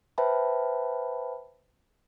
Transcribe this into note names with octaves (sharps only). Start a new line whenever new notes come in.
B4 C5 E5 G5 A5 B5